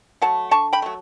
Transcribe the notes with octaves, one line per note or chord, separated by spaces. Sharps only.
F#3 A3 F#5 A5
D3 A5 C#6
G5 B5
F#3 A3